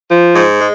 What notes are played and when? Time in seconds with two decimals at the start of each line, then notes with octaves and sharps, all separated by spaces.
0.10 F3
0.34 G#2
0.59 G#3